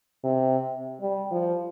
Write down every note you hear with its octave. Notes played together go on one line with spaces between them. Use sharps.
C3
G3
F3